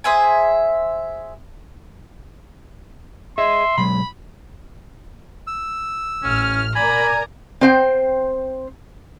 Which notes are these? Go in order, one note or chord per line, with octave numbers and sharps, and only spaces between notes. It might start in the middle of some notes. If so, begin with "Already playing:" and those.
G#4 C5 E5 G#5
G#4 D#5 E5 C6
B2 F#3 G#3 B5
E6
A1 C#4 F6
A#4 D5 G#5 A#5 B5
C4 C5 G5